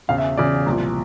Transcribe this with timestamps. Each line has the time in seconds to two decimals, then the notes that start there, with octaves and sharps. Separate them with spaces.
0.08 E1 E2 C#3 F5
0.18 E5
0.37 E1 E2 C#3 D5
0.66 C2 A#2 F3